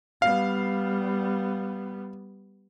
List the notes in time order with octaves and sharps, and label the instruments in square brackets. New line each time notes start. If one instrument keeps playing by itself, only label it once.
[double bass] G3 B3 [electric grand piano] F5